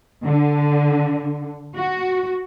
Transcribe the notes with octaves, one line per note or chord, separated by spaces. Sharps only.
D3
F#4